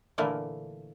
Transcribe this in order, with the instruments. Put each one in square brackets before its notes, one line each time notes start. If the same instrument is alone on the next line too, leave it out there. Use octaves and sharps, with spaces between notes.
[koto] A#2 D3 E3 A3 A#3